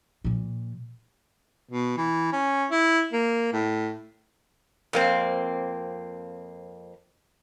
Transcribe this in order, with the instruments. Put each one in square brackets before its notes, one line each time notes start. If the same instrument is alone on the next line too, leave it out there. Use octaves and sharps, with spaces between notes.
[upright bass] A#2 F3
[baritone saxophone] B2
E3
C#4
E4
A#3
A2
[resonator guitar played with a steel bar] F2 A#3 C4